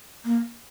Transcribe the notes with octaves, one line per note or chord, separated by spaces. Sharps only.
A#3